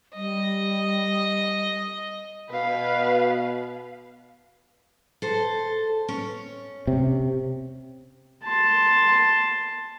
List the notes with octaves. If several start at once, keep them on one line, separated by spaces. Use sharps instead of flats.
G3 D#5
B2 B4 F5
A4 C5
C#4
C3
A5 C6